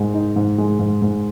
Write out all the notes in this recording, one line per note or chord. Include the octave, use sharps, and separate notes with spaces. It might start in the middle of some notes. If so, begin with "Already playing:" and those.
Already playing: G#2 G#3 D#4
D#4
G#2
G#3
G#2
G#2